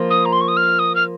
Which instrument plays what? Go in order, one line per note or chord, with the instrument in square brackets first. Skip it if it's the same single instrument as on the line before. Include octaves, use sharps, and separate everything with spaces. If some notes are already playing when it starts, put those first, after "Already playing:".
Already playing: [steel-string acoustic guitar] F3 A#3 F4
[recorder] D#6
A#5
C6
C#6
D#6
F6
D#6
F6